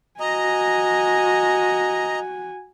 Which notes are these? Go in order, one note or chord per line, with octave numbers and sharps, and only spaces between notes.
F#4 D#5 G#5 A#5